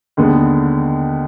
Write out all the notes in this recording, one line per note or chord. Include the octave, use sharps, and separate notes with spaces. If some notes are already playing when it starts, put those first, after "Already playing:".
D#2 D3 G#3 B3